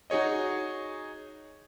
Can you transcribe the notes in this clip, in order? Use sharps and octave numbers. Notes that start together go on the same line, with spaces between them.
D#4 F#4 G#4 C#5 D#5